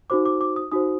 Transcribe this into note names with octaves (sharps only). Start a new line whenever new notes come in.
D#4 F#4 C5 D6
D6
D6
D#6
D#4 F#4 C5 D#6